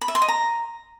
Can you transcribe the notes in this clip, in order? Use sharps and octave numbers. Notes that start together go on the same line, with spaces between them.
B5
E5
C6
D#5
A#5